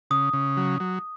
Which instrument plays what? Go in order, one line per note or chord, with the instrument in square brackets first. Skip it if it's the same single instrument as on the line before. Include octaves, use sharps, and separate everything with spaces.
[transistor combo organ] C#3 [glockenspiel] D#6
[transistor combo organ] C#3
F#3
F#3